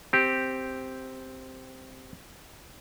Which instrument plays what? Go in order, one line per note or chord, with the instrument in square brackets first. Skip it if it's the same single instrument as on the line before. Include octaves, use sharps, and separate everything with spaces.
[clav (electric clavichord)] C4 G4